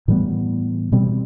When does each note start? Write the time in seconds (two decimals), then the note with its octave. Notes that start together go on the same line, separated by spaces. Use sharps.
0.08 A2 E3 G3 B3
0.92 B2 G3 C4